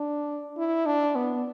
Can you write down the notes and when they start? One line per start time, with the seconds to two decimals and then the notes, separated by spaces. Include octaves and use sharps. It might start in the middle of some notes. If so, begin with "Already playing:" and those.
Already playing: D4
0.57 E4
0.86 D4
1.15 B3